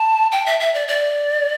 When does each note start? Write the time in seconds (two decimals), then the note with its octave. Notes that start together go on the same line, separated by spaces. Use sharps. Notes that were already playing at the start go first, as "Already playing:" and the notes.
Already playing: A5
0.32 G5
0.46 E5
0.60 E5
0.74 D5
0.88 D5